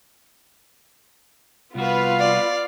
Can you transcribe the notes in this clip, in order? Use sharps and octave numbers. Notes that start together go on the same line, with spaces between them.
C2 B3 F4 F#4 B4 F5
D5